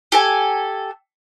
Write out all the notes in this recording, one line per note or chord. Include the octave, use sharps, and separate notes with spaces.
G4 A4 G#5